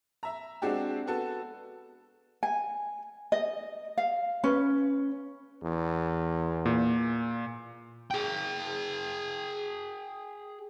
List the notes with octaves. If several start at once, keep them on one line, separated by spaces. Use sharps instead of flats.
E5 A#5
G#3 C4 D4 F#4 G4
B3 F#4 A4
G#5
D#5
F5
C#4 B4
E2
A#2
G#4 G5